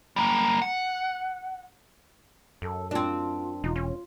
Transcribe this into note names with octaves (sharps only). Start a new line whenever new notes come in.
G3 A#3
F#5
F#2 A4
C4 D4 F4
E1 D#4 F4
C#4